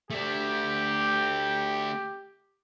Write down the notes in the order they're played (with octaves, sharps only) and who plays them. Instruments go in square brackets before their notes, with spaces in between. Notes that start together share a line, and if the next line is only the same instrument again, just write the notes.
[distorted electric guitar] A3 D4 [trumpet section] G4